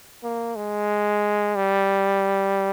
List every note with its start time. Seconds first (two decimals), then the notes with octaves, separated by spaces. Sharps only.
0.23 A#3
0.56 G#3
1.56 G3